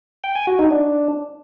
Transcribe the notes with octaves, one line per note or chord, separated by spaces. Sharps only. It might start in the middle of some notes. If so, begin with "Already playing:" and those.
G5
G#5
F#4
D#4
D4